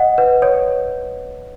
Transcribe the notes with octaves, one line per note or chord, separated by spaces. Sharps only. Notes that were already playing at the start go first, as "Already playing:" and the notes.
Already playing: D#5 F#5
B4
C#5